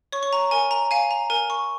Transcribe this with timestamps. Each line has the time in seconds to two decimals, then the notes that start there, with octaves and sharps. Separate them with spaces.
0.12 C#5 C#6
0.23 C#6
0.33 A#5
0.51 A#4 G#5
0.71 A#5
0.91 F5 G#5
1.11 A#5
1.30 A#4 G#5
1.50 C#6